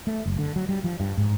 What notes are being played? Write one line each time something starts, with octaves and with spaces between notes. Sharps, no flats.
A3
F#1
D3
F#3
G3
F3
G2
G#2